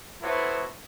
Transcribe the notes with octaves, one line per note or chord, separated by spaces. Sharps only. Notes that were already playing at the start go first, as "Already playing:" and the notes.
B3 E4 F#4 A4 C5 C#5